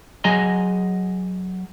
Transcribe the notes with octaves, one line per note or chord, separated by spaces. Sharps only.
F#3 G#4 D#5 G#5 A#5 C6